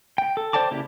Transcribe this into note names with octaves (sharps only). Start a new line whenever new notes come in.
G5
A4
C5 D5 G5 A5 D6
C#3 A#3 E4 G4